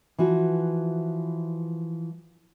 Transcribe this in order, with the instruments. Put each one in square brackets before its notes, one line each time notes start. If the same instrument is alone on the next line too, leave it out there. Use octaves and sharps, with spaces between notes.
[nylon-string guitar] E3 F3 F#4